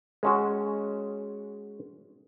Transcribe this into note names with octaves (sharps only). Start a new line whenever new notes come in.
G#3 C#4 F#4